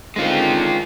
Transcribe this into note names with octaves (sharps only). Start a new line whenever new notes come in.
D3 D#3 G#3 C4 F4